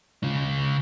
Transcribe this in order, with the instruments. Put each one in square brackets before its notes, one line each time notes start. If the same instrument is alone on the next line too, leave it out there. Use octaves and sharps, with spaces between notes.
[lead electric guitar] C#3 F4